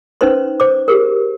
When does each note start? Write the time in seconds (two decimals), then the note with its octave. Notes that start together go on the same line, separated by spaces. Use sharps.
0.21 C#4 D#4 B4 C5 C6
0.60 C5 D6
0.88 G4 G#4 A#4